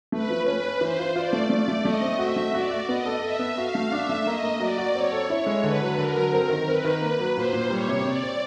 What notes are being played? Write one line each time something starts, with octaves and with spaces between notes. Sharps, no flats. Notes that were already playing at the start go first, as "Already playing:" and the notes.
A3 B4
F3
C#4 B4
C#4
E3 C5
F4
F4 D5
A3
A3 D5
A3
A3 D#5
C4
F#4 E5
A3
F#4 D5
F#4
B3 D#5
A4
A4 E5
B3
F#4 F5
A3
D4 E5
A3
A#3 D#5
A#3
F#3 D5
F#4
C4 C#5
A4
E4 C#5
G#3
D3 B4
F#3
D3 A#4
F#3
C4
D#3
C4 B4
D#3
A#3
F#3
A#2 C5
A#2
G3 C#5
C3
C3 D5
C4